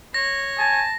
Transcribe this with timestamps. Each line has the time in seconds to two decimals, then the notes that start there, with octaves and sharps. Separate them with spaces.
0.14 C#5 A#6
0.59 G#5 A5